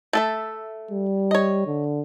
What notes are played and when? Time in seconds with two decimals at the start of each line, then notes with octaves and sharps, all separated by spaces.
0.13 A3 A4 E5
0.91 G3
1.31 C#5 D#5
1.67 D3